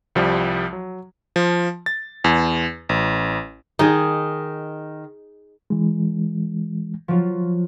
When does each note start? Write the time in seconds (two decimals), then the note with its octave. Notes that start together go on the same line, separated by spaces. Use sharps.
0.15 C2 F3 G3
0.73 F#3
1.36 F3
1.86 A6
2.24 E2
2.89 A1
3.79 D#3 D#4 G#4 D#5
5.70 E3 G#3
7.08 F3 F#3 F4